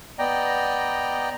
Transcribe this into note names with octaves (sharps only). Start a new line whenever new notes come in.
B3 D5 D#5 G5 A#5